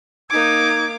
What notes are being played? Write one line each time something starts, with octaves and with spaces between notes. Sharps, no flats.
A#3 D#4 D6 E6 G#6